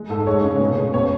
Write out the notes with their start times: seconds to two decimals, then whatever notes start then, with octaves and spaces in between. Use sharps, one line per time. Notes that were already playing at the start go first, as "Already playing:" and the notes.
Already playing: G#3
0.09 G#2 A4
0.27 G#3 C#5
0.43 C#3
0.60 B2
0.77 B2
0.94 B2 C#5